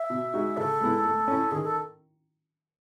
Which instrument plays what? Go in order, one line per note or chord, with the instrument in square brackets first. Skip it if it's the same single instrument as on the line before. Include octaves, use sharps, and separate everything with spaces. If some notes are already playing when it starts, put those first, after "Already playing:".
Already playing: [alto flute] E5
[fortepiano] B2
G#3 D#4 F#4
[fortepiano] C#3 [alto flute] A4
[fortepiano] G#3 B3 E4
A3
C#4 E4
[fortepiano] D#3 [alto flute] G#4
[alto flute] A4